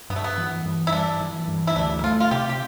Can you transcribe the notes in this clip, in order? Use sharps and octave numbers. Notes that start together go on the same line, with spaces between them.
G2 B3
A3
B3
E3
G2
E4
G2 D4
E3
G2
E4
D2 D4
A3 F4
F4
C3 G4
G4